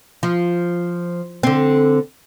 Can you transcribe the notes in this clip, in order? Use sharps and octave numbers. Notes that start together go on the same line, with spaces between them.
F3
D3 C4